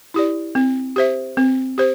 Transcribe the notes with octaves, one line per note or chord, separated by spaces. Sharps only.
E4 G4 D5
C4
G4 C5 E5
C4
G4 C5